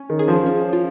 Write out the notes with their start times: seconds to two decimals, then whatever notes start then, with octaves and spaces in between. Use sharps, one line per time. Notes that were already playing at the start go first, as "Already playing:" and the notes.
Already playing: C#4
0.10 D#3
0.19 G#4
0.28 F3
0.46 C#4
0.73 F4